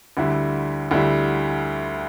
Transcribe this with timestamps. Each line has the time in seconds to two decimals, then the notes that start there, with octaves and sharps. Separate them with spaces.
0.17 D2 D3 G3 E4
0.91 D2 D3 G3 E4